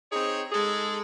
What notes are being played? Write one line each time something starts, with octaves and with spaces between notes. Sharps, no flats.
C4 D#4 G#4 C#5
G#3 D#4 G#4 A4